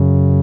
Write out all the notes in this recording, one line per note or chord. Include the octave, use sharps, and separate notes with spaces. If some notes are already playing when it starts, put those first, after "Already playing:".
Already playing: F#2 C#3